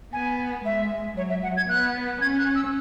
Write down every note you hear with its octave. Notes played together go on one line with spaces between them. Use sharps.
B3 G#5
G#3 E5
F#3 C#5
E5
F#5
G#6
B3 F#6
C#4 G#6
F#6
E6